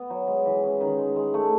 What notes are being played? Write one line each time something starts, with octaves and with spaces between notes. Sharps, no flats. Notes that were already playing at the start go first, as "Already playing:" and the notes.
Already playing: B3
F#3
G#3
E3
C#4
D#3
G#3
G#3
A3